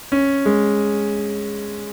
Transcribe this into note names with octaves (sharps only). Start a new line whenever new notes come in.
C#4
G#3